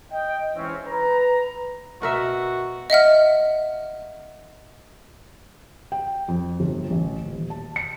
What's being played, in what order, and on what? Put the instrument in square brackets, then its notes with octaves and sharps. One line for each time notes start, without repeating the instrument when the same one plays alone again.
[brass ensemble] D#5 G5
G#2 E3 C4 C#4
B4 A#5
[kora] B2 A#4 E5 [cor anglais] F#4
[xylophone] D#5 E5 F#5 F6
[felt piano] G5
F2
G1
A1
D#1
A5
C#7